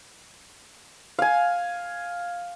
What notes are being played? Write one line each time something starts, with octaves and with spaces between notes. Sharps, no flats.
F5 G#5